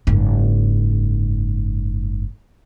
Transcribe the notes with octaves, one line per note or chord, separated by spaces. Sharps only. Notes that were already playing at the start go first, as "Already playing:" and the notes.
F#1 G#2